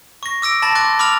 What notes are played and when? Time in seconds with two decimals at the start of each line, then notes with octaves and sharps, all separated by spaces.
0.23 C#6 A#6
0.42 D6 E6 A#6 D7
0.62 A5 B5 A6 A#6
0.75 C6 D6 F#6 A6
0.99 B5 D6 E6 F6 A6 F7